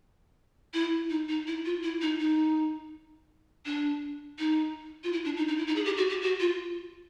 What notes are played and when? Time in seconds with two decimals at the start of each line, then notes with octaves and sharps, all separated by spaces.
0.74 E4
1.10 D#4
1.29 D#4
1.47 E4
1.65 F4
1.83 E4
2.01 D#4
2.20 D#4
3.66 D4
4.39 D#4
5.04 F4
5.12 E4
5.25 D4
5.37 D#4
5.48 D#4
5.58 E4
5.67 D#4
5.76 G#4
5.85 G4
5.97 F#4
6.10 G4
6.22 F#4
6.40 F4